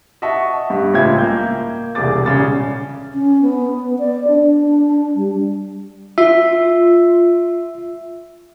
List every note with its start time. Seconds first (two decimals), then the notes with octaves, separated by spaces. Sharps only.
0.22 D#5 E5 F#5 A5 C#6
0.70 G2
0.94 C#2 A2 F4 E5 G5 G#6
1.18 A#3 G6
1.95 E1 C2 G#4 D6 A6
2.26 D#1 C#3 A6
3.14 C#4
3.42 B3
3.99 D5
4.28 D4
5.15 G3
6.18 F4 E5